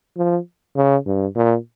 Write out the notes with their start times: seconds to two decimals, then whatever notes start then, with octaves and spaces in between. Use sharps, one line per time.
0.17 F3
0.76 C#3
1.06 G2
1.35 A#2